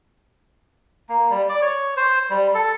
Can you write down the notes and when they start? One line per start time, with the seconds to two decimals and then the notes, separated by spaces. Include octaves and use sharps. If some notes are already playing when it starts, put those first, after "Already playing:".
1.09 A#3
1.30 G3
1.49 D5
1.62 C#5
1.97 C5
2.30 G3
2.54 A4